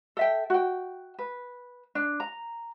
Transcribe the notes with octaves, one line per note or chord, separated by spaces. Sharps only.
A4 E5 G5
F#4 G5
B4
D4
A#5